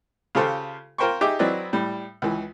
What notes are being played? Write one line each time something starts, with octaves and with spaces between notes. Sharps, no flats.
C#3 F4 G4 A4 C5
F4 A#4 C5 G5 C6 C#6
D#4 G4 G#4 E5 D6
F#3 C4 E4 B4 D5 D#5
A2 G3
C#2 E3